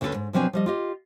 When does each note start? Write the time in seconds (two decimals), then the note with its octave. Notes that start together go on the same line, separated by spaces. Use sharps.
0.01 D2 D3 C#4 D4 A4 B4
0.14 G#2
0.33 B2 F3 F#3 C4 D4 G#5
0.53 F3 G3 D#5
0.66 F4 G4 D#5